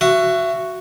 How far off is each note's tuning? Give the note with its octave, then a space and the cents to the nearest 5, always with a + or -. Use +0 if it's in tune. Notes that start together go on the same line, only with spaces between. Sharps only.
F#4 +0 E5 +30